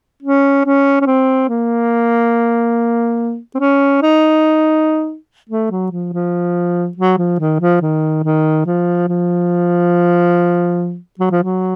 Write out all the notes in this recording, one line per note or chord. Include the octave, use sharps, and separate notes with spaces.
C#4
C#4
C#4
C4
A#3
C4
C#4
D#4
A3
F#3
F3
F3
F#3
F3
D#3
F3
D#3
D#3
F3
F3
F#3
F3
F#3